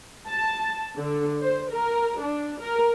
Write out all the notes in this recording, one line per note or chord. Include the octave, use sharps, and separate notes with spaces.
A5
D3
C5
A#4
D4
A#4